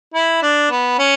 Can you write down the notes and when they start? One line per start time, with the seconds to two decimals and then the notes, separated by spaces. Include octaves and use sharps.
0.14 E4
0.42 D4
0.71 B3
0.99 C#4